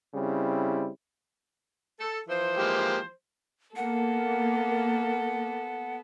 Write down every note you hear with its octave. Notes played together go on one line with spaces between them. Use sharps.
C#3 G3 C4 E4
A4
E3 F3 C5
G#3 A#3 G4
A#3 B3 A4 F#5